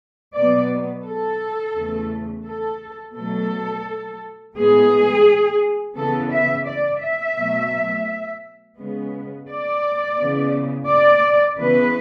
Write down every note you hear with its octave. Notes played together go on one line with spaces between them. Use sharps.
B2 F#3 B3 D5
A4
E2 C#3 E3 A3
A4
B2 F#3 A3 A4
A2 E3 G#3 B3 G#4
C#3 E3 B3 A4
E5
D5
E5
B2 F#3 A3
C#3 G#3 B3
D5
C#3 E3 B3
D5
C#3 E3 B3 B4